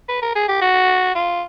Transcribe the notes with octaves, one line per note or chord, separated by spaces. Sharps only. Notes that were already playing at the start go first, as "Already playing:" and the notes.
B4
A#4
G#4
G4
F#4
F4